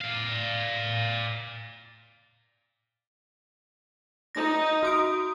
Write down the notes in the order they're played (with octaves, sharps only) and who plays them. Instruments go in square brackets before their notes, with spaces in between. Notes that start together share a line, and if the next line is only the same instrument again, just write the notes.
[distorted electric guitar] D5 F5
[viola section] D#4 [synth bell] A#6
[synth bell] F#4 D#6 D7